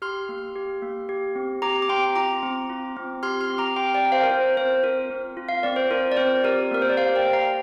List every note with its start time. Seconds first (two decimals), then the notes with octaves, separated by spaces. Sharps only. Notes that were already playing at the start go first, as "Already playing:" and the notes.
0.02 G4 C6 F6
0.29 A#3
0.55 G4
0.82 A#3
1.09 G4
1.36 C4
1.62 G4 A#5 D6
1.82 D6
1.89 C4 G5 C6
2.16 F4 A#5 D6
2.43 C4
2.70 F4
2.97 C4
3.23 G4 C6 F6
3.41 C6 F6
3.50 C4
3.58 A#5 D6
3.76 G4 G5 C6
3.94 D5 G5
4.03 C4
4.12 C5 F5
4.23 A#4
4.30 F4 C5
4.57 C4 C5
4.84 F4 A#4
5.10 C4
5.37 F4
5.48 F5
5.63 C4 D5
5.76 C5
5.91 F4 A#4
6.12 D5
6.17 C4 C5
6.44 G4 A#4 D5
6.71 A#3 A#4
6.82 C5
6.89 D5
6.97 G4 C5 F5
7.16 D5 G5
7.24 A#3
7.33 F5 A#5